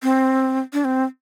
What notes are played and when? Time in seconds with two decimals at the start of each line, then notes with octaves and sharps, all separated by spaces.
0.03 C4
0.73 D4
0.85 C4